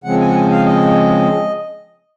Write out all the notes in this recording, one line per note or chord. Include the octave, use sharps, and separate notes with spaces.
C#3 F3 G#3 C4 F#5
G#5
F#5
G#5
F5
D#5